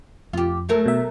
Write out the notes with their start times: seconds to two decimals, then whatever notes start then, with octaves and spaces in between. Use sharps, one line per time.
0.33 F2 F4 G4
0.69 F#3 A3 A#4
0.86 B2 E5